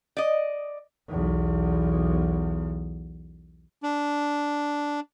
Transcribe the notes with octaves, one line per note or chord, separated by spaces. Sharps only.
D5 D#5
B1 E2
D4